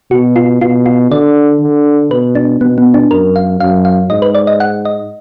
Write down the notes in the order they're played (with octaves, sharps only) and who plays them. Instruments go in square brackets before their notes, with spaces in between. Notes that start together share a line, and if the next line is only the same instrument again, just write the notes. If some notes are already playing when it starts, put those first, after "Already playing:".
[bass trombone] B2 [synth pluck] F#4
[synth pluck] F4
[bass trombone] B2 [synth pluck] F4
[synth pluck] F4
[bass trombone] D3 [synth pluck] D5
[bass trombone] D3
[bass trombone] B2 [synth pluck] B4
[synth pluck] D4
[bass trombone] B2 [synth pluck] B3
[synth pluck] B3
D4
[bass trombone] F#2 [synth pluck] A#4
[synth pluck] F5
[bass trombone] F#2 [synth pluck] F5
[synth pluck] F5
[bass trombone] G#2 [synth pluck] D#5
[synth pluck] B4
D5
D#5
F#5
D#5